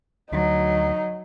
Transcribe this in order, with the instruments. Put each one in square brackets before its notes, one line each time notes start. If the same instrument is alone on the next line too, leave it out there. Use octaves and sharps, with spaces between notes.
[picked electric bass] D2 [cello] F#3 [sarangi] D#4